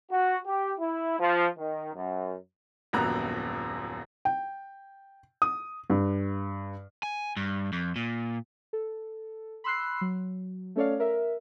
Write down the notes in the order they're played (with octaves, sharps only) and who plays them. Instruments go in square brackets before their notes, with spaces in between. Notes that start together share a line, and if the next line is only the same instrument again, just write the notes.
[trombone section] F#4
G4
E4
F3
D#3
F#2
[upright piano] D#1 A#1 F#2 B3 A#5 F#6
[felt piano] G5
D#6
G2
[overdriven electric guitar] G#5
G2
F2
A#2
[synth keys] A4
B5 C6 E6 F#6 C7
F#3
A3 C#4 A4 C#5 D5 F5
A#4 E5